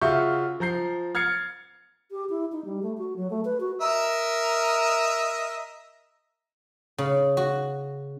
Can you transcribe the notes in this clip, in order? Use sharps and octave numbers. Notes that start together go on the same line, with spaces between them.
C#3 F4 F#4 E5 C#6 G6
F3 A#5 G6 C7
F6 G#6 A6 C7 C#7
G4
E4
D#4
G3
A3
F#4
F#3
A3
B4
F#4
A#4 D#5 E5
C#3
F#4